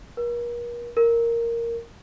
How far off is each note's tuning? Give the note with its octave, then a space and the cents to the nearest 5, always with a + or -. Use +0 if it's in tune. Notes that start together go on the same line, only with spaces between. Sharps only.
A#4 +40
A#4 -5